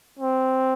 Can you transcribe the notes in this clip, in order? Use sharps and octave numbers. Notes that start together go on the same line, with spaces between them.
C4